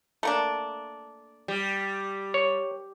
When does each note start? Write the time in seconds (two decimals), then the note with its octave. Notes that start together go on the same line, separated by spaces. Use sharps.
0.23 A3 A#3 D4
1.48 G3
2.34 C#5